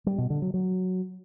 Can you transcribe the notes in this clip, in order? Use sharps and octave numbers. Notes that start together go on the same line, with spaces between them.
G3
B2
D3
F#3
F#3